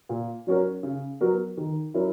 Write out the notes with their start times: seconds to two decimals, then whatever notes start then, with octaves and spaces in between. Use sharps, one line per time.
0.09 A#2
0.47 F#3 C#4 F#4 A#4
0.83 C#3
1.21 F#3 B3 F#4 A#4
1.57 D#3
1.94 F#3 C#4 E4 A#4